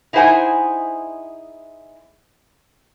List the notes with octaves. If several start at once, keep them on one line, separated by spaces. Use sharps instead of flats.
D#4 E4 G#4 C5 F#5 G#5